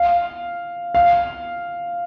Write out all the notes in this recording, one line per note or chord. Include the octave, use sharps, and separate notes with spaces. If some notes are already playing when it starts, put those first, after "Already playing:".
Already playing: F5
F5